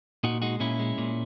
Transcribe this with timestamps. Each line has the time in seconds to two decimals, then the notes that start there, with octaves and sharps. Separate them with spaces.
0.24 A#2 D#4 F#4
0.42 G#3 D#4 F#4
0.60 A#2 C#4 E4
0.79 G#3
0.98 A#2